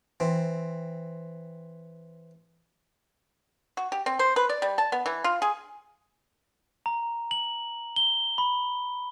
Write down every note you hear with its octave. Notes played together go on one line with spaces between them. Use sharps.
E3 C4
F#4
G4
C4
C5
B4
D5
G3
A5
B3
E3
F4
G#4
A#5
F#7
G7
B5